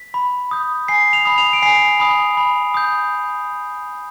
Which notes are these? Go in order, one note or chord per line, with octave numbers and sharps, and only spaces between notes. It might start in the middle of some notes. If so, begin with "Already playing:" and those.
Already playing: B6
B5
D#6 G6
G#5 C7
F7
B5 D#6
F7
D7
G#5 C7
B5 D#6
B5
D#6 G6